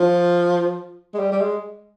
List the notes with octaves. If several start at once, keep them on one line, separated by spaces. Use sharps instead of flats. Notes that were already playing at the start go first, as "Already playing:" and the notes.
Already playing: F3
G#3
G3
G3
G#3